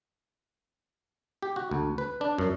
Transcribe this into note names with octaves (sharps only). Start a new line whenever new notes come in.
G4
F#4
D2
B4
D4
F#2